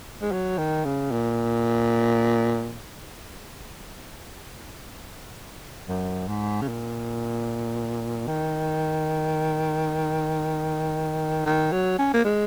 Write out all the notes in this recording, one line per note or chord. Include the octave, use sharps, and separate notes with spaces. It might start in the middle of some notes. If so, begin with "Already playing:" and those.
G#3
F#3
D#3
C#3
A#2
F#2
G#2
C#3
A#2
D#3
D#3
F#3
C#4
A#3
G#3